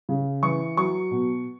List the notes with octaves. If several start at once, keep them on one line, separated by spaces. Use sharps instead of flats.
C#3
E3 C#6
F#3 C#6
B2